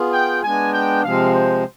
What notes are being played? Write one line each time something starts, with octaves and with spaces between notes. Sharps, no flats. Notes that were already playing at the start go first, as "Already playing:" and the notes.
Already playing: B3 F4 G#4
G5
G#3 B3 D4 G#5
G5
C3 F3 G#3 C4 F5
C5